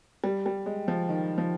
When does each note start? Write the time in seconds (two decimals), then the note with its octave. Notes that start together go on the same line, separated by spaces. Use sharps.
0.24 G3
0.46 G3
0.66 G#3
0.88 F3
1.09 D#3
1.38 F3